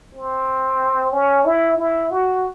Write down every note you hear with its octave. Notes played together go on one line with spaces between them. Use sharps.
C4
C#4
E4
E4
F#4